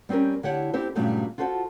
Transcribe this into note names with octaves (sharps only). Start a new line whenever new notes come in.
G3 C4 C#4 G4 A#4
D3 E4 G4 C#5 F#5
C4 E4 G4 A4 C5
G2 A#2 C#3 F#3 G3 A3
F4 F#4 A4 C5 F5 F#5